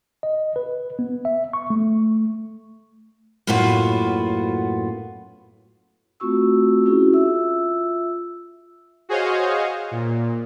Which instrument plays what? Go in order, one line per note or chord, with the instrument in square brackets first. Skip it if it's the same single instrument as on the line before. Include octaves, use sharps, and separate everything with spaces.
[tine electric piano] D#5
B4
B3
E5
C#6
A3
[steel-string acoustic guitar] F#2 A2 A#3 B3 F4 F#4
[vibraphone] A3 C4 F4 F#4 C#6 E6
C#4 E4 F#4 G#4
F4 E5 E6
[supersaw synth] F#4 G#4 C5 C#5 D#5 F5
A#2